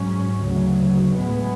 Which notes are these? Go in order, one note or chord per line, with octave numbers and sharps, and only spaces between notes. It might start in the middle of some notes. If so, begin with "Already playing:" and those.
Already playing: G#2 F#3 C#4
D2 C#3 F#3
A2 G#3 B3